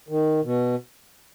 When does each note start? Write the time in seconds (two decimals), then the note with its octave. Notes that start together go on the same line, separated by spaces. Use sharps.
0.09 D#3
0.44 B2